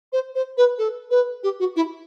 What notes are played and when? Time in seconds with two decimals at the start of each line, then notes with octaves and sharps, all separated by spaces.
0.12 C5
0.35 C5
0.57 B4
0.78 A4
1.10 B4
1.43 G4
1.59 F#4
1.76 E4